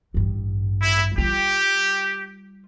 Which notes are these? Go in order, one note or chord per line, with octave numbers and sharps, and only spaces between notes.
A1 G2
E4
G3 F4 G4